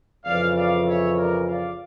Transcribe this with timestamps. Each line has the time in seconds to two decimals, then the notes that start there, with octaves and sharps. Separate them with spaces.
0.24 F2 C#3 E3 D5 F5
0.55 D5 F5
0.86 C#5 E5
1.17 A#4 D5
1.47 D5 F5